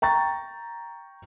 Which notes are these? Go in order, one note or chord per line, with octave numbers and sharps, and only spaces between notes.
G5 A#5 C#6 A6